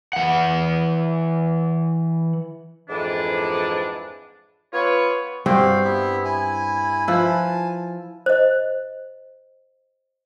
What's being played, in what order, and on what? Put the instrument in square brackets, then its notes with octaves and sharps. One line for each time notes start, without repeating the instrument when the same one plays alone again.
[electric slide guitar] E3 F#5
[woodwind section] F2 G#2 E3 D4
B3 F4 B4 C#5
[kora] G2 C4 G4 [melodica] F#4 F5
[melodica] B3 E4 E5
E4 G#5
[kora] F3 E4 B4 [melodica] G#5 A5
[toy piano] C5 D#5